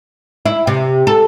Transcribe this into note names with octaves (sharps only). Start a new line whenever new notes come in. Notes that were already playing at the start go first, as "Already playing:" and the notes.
E4
C3
A4